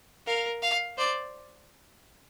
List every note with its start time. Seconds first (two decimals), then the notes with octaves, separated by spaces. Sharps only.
0.27 A#4 F5
0.62 F5
0.98 C5 D5